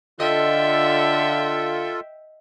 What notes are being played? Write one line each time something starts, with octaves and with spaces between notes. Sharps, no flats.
D3 F4 A4 D#5 E5 G5